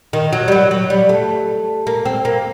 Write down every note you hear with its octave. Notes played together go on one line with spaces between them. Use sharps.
D#3
F#3
G3
F#3
F#3
G3
A3
A#3
C4
A#3